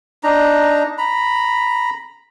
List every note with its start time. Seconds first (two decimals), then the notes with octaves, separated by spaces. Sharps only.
0.23 D4 D#4 A#5
0.98 A#5 B5